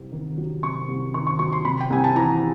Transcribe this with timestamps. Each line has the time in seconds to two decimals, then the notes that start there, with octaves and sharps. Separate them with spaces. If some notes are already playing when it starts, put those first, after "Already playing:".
Already playing: C2 C3
0.12 D#3
0.38 F#3
0.63 C3 C#6
0.88 C2
1.14 D#3 C#6
1.27 C#6
1.39 F#3 C#6
1.52 C6
1.65 C3 B5
1.81 G5
1.90 C2 G#5
2.04 A5
2.16 E3 A#5